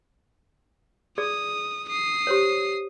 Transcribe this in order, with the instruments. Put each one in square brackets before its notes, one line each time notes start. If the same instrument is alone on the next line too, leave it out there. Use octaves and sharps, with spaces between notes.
[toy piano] G#4 D5 [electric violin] D#6
[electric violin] D#6 C7
[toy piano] G4 C5 C#5